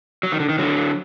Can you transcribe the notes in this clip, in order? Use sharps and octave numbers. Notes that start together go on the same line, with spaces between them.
F#3
D#3
D3
D#3
D3 F#3